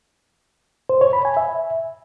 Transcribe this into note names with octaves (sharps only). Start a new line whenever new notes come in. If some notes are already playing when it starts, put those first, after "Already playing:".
C5
C#5
B5
G#5
E5